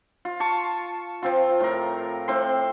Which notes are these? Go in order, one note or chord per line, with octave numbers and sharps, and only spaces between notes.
F4
A5 C#6
F3 C4 F4
A2 A#4
A2 C4 C6